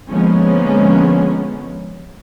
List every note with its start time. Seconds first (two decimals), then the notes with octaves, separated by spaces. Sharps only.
0.11 D3 F3 G#3 A#3 B3 C#4